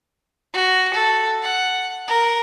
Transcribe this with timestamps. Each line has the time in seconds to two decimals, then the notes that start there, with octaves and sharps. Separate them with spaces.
0.53 F#4
0.94 A4
1.43 F#5
2.08 A#4